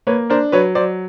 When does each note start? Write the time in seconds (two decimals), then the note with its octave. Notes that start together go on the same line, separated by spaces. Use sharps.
0.07 A#3 B4 C#5
0.30 D4 A#4 C5
0.52 F#3 B4 C#5
0.75 F#3 C5 D5